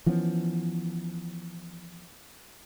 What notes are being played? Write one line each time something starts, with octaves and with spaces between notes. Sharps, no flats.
E3 F3 B3 C#4